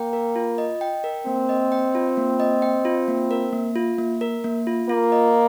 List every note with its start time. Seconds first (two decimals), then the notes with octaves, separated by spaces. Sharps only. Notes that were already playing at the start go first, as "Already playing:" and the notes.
Already playing: A#3 G5
0.13 A#4
0.36 F4
0.58 D#5
0.81 G5
1.04 A#4
1.26 A#3 C4
1.49 D#5
1.72 G5
1.95 F4
2.17 A#3
2.40 D#5
2.62 G5
2.85 F4
3.08 A#3
3.31 A#4
3.53 A#3
3.76 F4
3.98 A#3
4.21 A#4
4.44 A#3
4.67 F4
4.89 A#3 F4
5.12 D#5